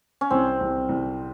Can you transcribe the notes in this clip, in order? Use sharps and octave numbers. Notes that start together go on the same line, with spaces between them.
C#4
C2 C4
C2
C2